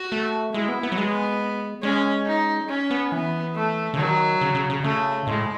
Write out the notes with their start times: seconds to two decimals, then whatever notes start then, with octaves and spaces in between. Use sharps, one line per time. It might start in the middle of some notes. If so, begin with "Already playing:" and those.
Already playing: F#4
0.12 A3
0.54 G#3 E4
0.68 B3
0.83 B3
0.92 F#3
0.97 G#3 B3
1.83 G#3 C#4
2.27 D#4
2.69 C#4
2.91 B3
3.12 E3 B3
3.55 A3
3.94 C#3
3.97 D#3 F#3
4.41 C#3
4.55 C#3
4.70 C#3
4.83 C#3 A3
5.26 A2 G#3